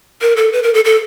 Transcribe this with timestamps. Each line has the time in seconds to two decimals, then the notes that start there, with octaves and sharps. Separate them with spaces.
0.22 A#4
0.37 A4
0.53 B4
0.63 A#4
0.74 A4
0.85 A4